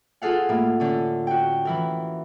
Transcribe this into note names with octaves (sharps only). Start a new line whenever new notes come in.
F4 G#4 A4 F5 F#5
A2 A#3
D3 C#4
F#4 G5
E3 E4 A#4